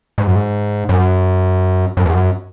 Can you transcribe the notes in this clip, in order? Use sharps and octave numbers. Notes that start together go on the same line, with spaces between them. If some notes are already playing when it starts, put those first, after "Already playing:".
G#2
F#2
G#2
F#2
F#2
E2
F#2